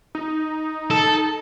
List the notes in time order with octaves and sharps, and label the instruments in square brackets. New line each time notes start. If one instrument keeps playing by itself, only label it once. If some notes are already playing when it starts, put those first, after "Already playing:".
[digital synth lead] D#4
[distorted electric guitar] A4